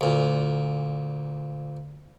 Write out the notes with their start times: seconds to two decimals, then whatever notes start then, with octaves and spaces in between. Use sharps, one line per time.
0.01 D2 A#2